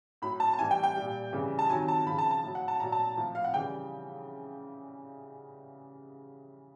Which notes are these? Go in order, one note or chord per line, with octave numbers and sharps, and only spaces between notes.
A2 F#3 B5
A5
A5
A2 E3 G3 G#5
G5
G5
A#2 G3
C#3 E3 G3
A5
C3 D#3 F#3 G#5
A5
C#3 F3 B5
A5
A5
A2 F#3
F#5
A5
A#2 F#3 A#5
A5
A2 F3
F5
F#5
C#3 E3 G3 G5